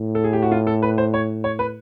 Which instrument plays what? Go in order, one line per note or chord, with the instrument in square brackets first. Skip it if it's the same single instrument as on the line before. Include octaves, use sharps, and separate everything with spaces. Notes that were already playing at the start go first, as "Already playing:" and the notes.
Already playing: [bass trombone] A2
[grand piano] A4
G#4
G4
F#4
F4
A4
B4
C5
C#5
C#5
B4